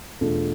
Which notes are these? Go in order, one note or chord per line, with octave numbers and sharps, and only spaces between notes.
E2 B2 A3 D4 F4